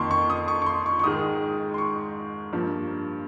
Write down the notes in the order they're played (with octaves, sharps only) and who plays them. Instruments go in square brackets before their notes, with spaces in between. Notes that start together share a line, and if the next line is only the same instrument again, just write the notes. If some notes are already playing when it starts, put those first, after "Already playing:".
Already playing: [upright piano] F2 D#3 A#3 C6 C#6
C#6
D#6
C#6
C#6
C6
C#6
C#6
G#2 D#3 G#3 D#6
C6
C#6
G2 F3 A#3